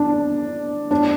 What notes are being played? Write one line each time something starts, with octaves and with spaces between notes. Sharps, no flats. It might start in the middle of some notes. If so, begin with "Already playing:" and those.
Already playing: D4
D4